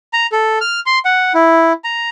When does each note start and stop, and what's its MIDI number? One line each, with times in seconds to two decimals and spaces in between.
0.13 0.27 82
0.32 0.59 69
0.61 0.80 89
0.86 0.99 84
1.05 1.33 78
1.34 1.73 64
1.84 2.10 82